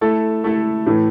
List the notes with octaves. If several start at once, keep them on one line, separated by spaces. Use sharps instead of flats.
A3 E4 A4
A3 E4 A4
A2 E3 A3